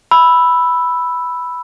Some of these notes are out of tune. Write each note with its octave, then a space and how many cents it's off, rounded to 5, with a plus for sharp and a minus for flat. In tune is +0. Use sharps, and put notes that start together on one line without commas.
B5 +0 E6 +0